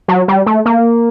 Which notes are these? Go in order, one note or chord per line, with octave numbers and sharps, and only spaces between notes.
F#3
G3
A3
A#3